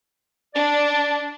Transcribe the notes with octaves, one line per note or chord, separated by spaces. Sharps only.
D4 D5